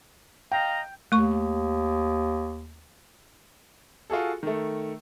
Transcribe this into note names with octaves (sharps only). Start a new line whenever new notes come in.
D#5 F5 G5 A#5
D#2 A3 C#6
F4 F#4 G#4 A4
D#3 A3